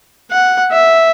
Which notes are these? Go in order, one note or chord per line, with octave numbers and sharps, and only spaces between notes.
F#5
E5